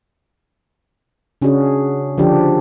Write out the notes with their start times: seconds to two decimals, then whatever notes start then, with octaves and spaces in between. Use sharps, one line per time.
1.42 C#3 C#4 D4 F#4 G#4
2.18 D3 F3 D4 G4